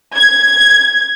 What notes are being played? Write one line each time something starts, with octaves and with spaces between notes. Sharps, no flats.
G#6